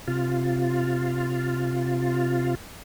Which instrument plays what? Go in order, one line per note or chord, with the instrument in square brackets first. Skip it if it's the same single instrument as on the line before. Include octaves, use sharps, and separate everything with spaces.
[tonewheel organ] C3 F4